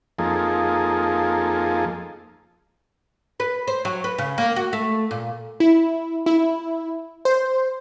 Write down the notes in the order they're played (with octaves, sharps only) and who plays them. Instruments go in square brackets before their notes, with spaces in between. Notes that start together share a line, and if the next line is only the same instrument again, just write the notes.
[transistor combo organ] F2 F3 A#3 D#4 G#4 A4
[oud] B4
C5
F#3
B4
C#3
A#3
F#4
A3
A#2
[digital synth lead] E4
E4
C5